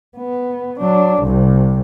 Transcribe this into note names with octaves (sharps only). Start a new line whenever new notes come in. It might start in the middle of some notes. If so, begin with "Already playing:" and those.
B3
F#3 D4
C2 C3